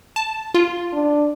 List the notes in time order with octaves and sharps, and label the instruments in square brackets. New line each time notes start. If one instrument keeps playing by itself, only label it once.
[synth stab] A5
F4
[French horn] D4